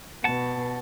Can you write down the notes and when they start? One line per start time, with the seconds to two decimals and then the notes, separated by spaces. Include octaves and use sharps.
0.24 B2 F#5 A5